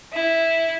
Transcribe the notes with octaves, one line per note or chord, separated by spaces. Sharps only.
E4